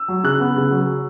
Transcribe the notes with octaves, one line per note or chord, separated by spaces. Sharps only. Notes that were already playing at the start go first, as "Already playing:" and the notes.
Already playing: E6
F#3
C#3 F#6
B3
C#3
F#3